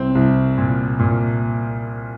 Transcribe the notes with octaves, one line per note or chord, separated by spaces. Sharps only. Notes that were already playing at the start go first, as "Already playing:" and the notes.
Already playing: C2 C4
C2
A#2
A#2